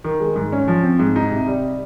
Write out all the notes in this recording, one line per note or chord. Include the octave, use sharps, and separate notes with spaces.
D#3
G#3
G#2
C#4
F3
C4
G#2
D#4
C3
G3